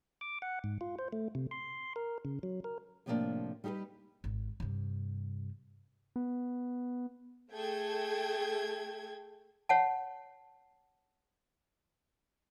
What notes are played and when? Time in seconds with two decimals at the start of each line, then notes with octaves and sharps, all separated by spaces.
0.21 D6
0.42 F#5
0.64 G#2
0.81 F4
0.99 C5
1.13 A3
1.35 C3
1.51 C6
1.96 A#4
2.25 C#3
2.43 F#3
2.64 A#4
3.06 A2 C3 F3 A3 A#3 D4
3.64 G3 D#4 G4 G#4 B4
4.24 G#1
4.60 G2 C3
6.16 B3
7.51 A3 G#4 A4 G5 G#6
9.69 C#5 F#5 A5